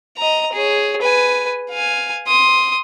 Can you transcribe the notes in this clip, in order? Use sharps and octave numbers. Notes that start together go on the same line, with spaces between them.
D#5 A#5
G#4 C#5
B4 G#5
F5 G#5
C6 D#6